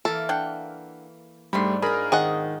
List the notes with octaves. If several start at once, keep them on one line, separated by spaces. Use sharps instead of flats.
E3 A#3 A4
D4 F#5 G5
G#2 G3 A3 D4 B5 C6
D#4 F4 G#4 A#4 B5
D#3 C4 G#4 D#5 F#5